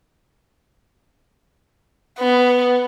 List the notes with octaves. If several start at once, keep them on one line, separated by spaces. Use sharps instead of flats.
B3